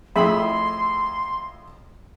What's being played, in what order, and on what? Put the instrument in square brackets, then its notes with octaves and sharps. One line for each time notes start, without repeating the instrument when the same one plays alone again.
[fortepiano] F2 A2 [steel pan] G#4 E5 B5 [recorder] C6